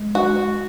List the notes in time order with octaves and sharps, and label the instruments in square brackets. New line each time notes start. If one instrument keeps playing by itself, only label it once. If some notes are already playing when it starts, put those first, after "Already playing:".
Already playing: [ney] G#3
[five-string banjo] F#4